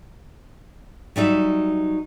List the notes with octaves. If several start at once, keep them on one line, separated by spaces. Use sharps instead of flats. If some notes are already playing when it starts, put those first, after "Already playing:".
F#3 G3 D#4 E5